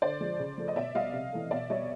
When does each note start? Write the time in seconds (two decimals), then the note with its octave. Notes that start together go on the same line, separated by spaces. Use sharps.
0.02 D3 C5 D5
0.21 F3 G#3
0.39 C#3
0.58 F3 A3
0.68 D#5
0.76 B2 D5 E5
0.95 G3 D#5 F5
1.13 C3
1.33 E3 A3
1.51 B2 D5 E5
1.70 G3 C#5 D#5